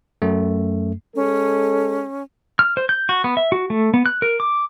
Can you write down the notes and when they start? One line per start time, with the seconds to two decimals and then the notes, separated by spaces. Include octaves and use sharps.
0.22 F#2 A3
1.16 G#3 C#4 A4
2.59 F6
2.77 C5
2.89 G6
3.09 F#4
3.24 B3
3.37 E5
3.52 F#4
3.70 A3
3.94 B3
4.06 F#6
4.22 A#4
4.40 D6